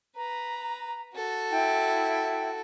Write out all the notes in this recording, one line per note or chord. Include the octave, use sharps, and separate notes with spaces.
B4 A#5
F#4 A4
E4 G5